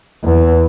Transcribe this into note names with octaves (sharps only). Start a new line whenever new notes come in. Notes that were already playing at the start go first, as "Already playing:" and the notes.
E2